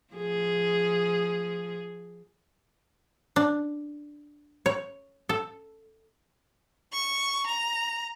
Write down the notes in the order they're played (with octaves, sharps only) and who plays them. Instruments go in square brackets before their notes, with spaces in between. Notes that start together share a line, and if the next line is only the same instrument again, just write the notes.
[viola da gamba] F3 G#4
[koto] D4
C#5
A4
[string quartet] C#6
A#5